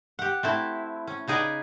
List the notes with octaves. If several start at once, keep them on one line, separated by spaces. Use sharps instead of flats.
G4 F#5
A3 C4 E4
C#4
C#3 D#4 G#4 B4 D5 D#5